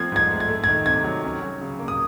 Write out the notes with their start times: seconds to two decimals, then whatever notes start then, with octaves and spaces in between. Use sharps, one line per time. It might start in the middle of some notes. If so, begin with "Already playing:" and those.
Already playing: F3 A3 C4 G#6
0.12 G#2 G#6
0.31 A3
0.40 G#6
0.49 A3
0.64 D#3 G#6
0.86 C3 G#6
1.04 F#3
1.24 C#4
1.42 F#3
1.61 C#3
1.79 A#3
1.88 D#6